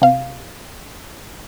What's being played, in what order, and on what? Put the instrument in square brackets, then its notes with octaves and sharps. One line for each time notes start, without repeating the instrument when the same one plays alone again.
[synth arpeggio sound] C3 F5